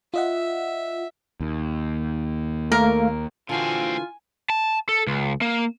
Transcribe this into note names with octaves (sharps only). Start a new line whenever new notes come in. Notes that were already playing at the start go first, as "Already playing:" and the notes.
F4 D#5 E5 F#5
D#2
A3 A#3 A#4 F5
A#2 D3 E3 C4 F4 F#4 G#5
A5
A4
C#2
A#3